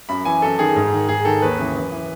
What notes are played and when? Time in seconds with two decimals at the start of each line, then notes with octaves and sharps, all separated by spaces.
0.09 F#2 B5
0.25 E3 G#5
0.42 F#2 A4
0.59 D#3 G#4
0.76 G#2
0.93 D#3
1.09 G#2 G#4
1.25 D#3 A4
1.42 D#2 B4
1.59 C#3 E3
1.76 F#2
1.92 E3